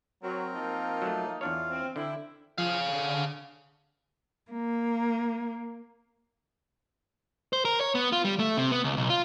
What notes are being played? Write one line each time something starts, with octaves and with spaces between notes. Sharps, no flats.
F#3 C4 A#4
F3 A#3 D#4
F#3 A3
E2 D4 F4 C#5
C4
D3 E4 G5
F3 G#4 F5
D3
A#3
C5
A#4
C#5
B3
F4
G3
A3
C3
B3
C#2
B1
F4